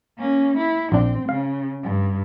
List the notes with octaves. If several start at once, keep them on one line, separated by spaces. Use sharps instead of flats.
A#3 C#4
E4
A#1 C4 D4
C#3 F5
G2